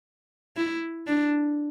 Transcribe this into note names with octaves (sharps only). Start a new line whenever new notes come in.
E4
D4